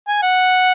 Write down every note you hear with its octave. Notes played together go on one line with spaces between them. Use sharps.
G#5
F#5